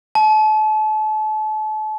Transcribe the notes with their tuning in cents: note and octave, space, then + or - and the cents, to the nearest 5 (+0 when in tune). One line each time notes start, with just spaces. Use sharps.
A5 -35